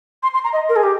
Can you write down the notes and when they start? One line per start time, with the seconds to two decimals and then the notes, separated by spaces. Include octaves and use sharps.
0.23 C6
0.34 C6
0.44 A#5
0.53 D#5
0.69 A#4
0.76 G#4
0.83 G4